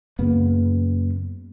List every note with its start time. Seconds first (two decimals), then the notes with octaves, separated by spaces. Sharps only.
0.19 F#2 C#3 A#3 B3